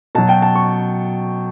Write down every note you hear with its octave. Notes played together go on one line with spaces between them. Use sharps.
B2 F#3 A5
G5
A5
C#6